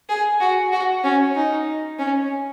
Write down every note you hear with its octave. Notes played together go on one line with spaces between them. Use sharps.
G#4
F#4
F#4
C#4
D#4
C#4